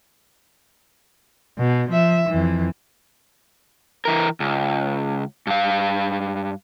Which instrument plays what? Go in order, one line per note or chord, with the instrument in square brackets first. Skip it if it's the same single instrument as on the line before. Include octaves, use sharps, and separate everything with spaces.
[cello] B2
F3 E5
F2 E3
[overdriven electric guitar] E3 A#4
C#2
G2 F5